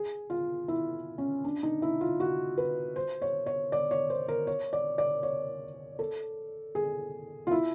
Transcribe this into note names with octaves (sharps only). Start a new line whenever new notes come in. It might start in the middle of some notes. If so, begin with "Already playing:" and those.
Already playing: G#4
F4
E4
C#4
D4
D#4
E4
F4
F#4
B4
C5
C#5
C#5
D5
C#5
C5
A#4
C#5
D5
D5
C#5
A4
G#4
F4
E4